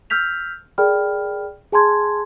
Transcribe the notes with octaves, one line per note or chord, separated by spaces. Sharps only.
E6 F6 G6 B6 F7
G#4 A#4 D5 G5 B5 F6
G#4 G#5 A5 C6 G#6